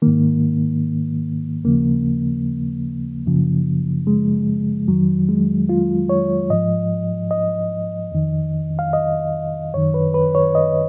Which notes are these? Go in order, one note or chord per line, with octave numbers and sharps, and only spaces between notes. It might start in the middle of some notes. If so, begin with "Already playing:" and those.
G#2 D#3 A#3
D#2 C#3 F3 A#3
F#2 C#3 F3
G#3
F2 D#3 F#3
G#3
F4
C#5
G#2 F3 D#5
D#5
F2 D#3
F5
D#5
F#2 D#3 C#5
B4
B4
C#5
D#5